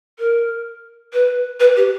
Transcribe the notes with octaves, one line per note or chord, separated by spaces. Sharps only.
A#4
B4
B4
G4